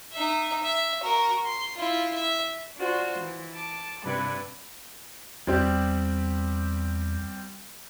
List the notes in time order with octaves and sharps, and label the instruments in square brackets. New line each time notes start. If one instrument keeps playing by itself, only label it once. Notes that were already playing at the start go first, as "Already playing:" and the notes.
[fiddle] D#4 E5
E5
F#4 A#4
C6
E4 F4
E5
[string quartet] D4 F4 F#4 C5
E3
A5 D6
G2 C3 G3 D4 E4 B4
[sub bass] E2 [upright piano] G3 C4 G4